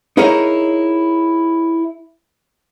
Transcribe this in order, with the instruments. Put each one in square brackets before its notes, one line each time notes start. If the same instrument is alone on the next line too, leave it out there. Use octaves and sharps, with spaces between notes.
[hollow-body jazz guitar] D#4 E4 G#4 A#4 C#5 D#5